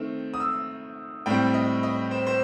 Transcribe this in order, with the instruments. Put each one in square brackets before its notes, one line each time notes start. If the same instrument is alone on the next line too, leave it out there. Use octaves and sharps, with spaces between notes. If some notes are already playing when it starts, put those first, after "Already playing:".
Already playing: [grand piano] D#3 A3 C4
D#6
E6
A2 G3 C4 G5
D#5
D#5
C5
C5